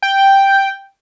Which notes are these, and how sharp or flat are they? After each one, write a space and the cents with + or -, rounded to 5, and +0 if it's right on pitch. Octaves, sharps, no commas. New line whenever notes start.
G5 +0